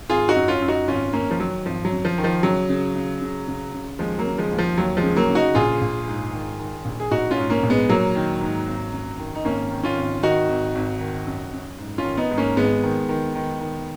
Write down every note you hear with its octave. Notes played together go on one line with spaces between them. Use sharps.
G#1 F4 G#4
D#4 F#4
F#2
C#4 F4
F#2
D#4 F#4
G#1 C#4 F4
F#2 A#3 C#4
F3
D#3 F#3
G#1 F3
F#3
F#2
F3
D#3
F3
C#3 F#3
C#3
C#3
C#3
C#3
C#3
D#2 F3 G#3
F#3 A#3
C#3
F3 G#3
D#2
F3
D#2 F#3
F3 G#3
C#3
F#3 A#3
C#3
D#4 F#4
A#1 F4 G#4
A#1
G#2
D#3
D#3
A#1
G#4
A#1 D#4 F#4
C#4 F4
G#2
A#3 C#4
A#1
G#3 B3
A#1 F#3 A#3
D#3
G#2
G#1
F#2
D#3
D#4
G#1 A#3 C#4
D#3
C#4 F4
G#1
D#3 D#4 F#4
G#1
G#1
D#3
F#2
F#2
G#2
C#4 F4
D#3
B3 D#4
G#2
A#3 C#4
G#1 G#3 B3
D#3
D#3
D#3
D#3